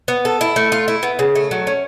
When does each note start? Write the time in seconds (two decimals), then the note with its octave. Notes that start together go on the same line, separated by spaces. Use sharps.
0.08 B3
0.25 A4
0.41 E4
0.56 A3
0.72 F4
0.88 E4
1.03 B3
1.19 C#3
1.35 A3
1.51 F#3
1.67 C#4